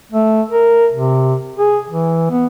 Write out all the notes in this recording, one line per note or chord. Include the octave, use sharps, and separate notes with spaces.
A3
A#4
C3
G#4
E3
B3